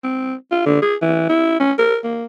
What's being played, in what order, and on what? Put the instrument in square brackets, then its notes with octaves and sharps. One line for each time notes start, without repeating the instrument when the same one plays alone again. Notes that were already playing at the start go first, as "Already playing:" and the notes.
[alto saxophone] C4
F4
D3
G#4
E3
E4
C#4
A#4
A#3